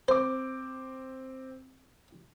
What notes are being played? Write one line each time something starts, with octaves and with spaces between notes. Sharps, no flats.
C4 C5 D6